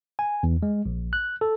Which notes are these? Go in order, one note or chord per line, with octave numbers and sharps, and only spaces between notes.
G#5
E2
G#3
A#1
F#6
A4